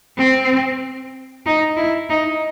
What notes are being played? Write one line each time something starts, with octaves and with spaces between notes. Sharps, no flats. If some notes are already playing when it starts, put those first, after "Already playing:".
C4
D#4
E4
D#4